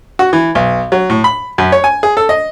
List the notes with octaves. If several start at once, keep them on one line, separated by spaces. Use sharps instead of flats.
F#4
E3
B1
F#3
A2
B5
F#2
C#5
G#5
G#4
A4
D#5